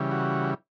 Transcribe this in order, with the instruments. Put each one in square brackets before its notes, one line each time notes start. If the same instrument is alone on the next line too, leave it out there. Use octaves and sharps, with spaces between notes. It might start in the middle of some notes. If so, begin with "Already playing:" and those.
Already playing: [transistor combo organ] C#3 E3 G3
F#4